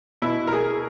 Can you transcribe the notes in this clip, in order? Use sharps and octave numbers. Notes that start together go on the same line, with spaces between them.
B2 E4
A#4
G#4